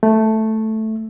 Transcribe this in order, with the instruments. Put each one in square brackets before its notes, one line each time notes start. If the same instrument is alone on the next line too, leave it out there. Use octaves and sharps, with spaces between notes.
[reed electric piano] A3